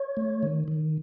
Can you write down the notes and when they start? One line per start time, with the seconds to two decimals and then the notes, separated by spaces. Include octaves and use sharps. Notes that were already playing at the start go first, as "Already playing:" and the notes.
Already playing: C#5
0.17 A3
0.43 D#3
0.68 D#3